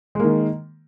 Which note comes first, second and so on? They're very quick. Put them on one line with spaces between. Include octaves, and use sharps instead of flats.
G#3 A#3 D#3